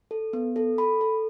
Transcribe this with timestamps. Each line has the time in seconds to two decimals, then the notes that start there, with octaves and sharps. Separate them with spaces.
0.11 A4
0.33 B3
0.56 A4
0.78 A4 B5
1.01 A4